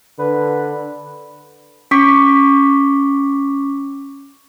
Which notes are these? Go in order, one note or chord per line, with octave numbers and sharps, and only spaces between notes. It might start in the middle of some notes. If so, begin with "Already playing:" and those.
D3 B4
C#4 C#6 D6 B6